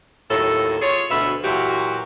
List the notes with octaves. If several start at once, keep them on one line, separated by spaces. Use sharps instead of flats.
D#2 A2 F#3 A4
F4 G#4 C#5
D2 B2 B4 E5
A#2 E3 F#3 F#4 G4